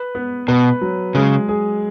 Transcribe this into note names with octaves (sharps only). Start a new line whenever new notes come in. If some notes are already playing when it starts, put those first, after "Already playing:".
Already playing: B4
B3
B2 B4
F#3
C#3 G#3
G#4